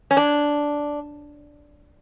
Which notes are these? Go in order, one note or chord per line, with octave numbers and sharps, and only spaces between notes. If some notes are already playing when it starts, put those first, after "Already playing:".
C#4
D4